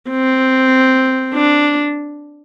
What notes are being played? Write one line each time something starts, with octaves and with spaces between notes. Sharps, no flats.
C4
D4